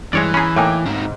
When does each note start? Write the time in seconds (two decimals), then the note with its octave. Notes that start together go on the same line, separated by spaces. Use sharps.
0.13 G2 E3 G#3 C#5 D5
0.34 C#4 G#4 G#5 A#5 B5
0.56 A2 A#3 D#4 G5 G#5 D6
0.86 G#2 D#3 C4